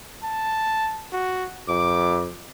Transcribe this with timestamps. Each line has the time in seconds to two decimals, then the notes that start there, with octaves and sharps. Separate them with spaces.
0.23 A5
1.13 F#4
1.68 F2 D6